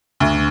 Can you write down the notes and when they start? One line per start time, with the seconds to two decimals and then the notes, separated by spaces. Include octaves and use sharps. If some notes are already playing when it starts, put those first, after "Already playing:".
0.20 D2